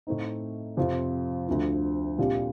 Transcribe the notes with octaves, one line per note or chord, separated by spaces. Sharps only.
A2 A3 C4 D#4
F2 C3 F3 C4 F4
D2 D3 F3
C2 A#2 G3 D4 F4